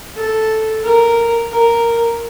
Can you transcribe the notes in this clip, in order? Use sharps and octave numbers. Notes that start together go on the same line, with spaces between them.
A4
A#4
A#4